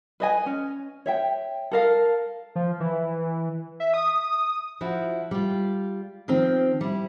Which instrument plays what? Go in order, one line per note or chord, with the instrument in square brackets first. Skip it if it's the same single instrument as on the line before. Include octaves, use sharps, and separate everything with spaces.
[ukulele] B4 D#5 G#5
C#4
C#5 E5 G5
A4 A#4 F5
[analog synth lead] F3
E3
E5
D#6
[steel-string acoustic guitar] F3 E4 F#4
G3 F4
D#3 F3 C4
G3 E4